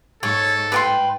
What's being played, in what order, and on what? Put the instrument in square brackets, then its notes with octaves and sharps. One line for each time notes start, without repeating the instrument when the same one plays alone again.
[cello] G#2 [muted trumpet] A4 [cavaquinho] C#5
[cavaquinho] B4 G5 C6